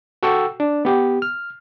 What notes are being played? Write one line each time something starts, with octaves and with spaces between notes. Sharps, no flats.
F#4 A4 G5 C#6 E6
D4
B3 G4
F6